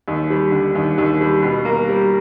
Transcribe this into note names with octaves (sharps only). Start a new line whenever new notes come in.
D#2
G3
D3
D#2
D#2
G3
B2
A#3
G3